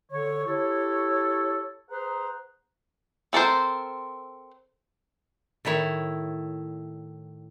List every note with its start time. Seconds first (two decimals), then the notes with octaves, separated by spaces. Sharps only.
0.12 D3 C#5
0.46 E4 G4 A4 C#5
1.91 G#4 B4 C5 F#5 A#5
3.33 C4 A4 A#4 C5
5.65 A2 D#3 E4 C#5